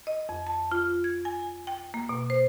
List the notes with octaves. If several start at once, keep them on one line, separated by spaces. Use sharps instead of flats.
D#5
F2
A5
F4
G#6
G#5
G5
A#3
B2
C5